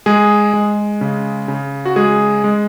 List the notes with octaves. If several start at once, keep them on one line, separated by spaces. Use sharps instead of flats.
G#3 G#4
G#3
C#3
C#3
F#4
G#3 G#4
G#3